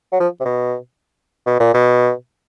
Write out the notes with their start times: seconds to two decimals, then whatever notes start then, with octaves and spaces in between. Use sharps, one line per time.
0.12 F#3
0.20 F3
0.40 C3
0.45 B2
1.46 B2
1.60 A#2
1.74 B2